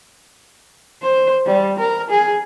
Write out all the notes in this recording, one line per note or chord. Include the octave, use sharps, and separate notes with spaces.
C5
G3
A#4
G#4